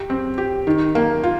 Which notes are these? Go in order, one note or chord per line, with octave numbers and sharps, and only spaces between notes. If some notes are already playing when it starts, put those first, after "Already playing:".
Already playing: G4
C4
G4
D#3
A#3
F4